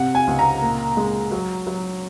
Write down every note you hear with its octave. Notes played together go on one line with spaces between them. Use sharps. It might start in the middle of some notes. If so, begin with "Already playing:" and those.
Already playing: C3 F#5
G#5
C#2
A#5
A#2
G#3
F#3
F#3